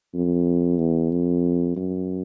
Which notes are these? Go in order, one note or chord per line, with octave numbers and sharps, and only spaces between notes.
F2
E2
F2
F#2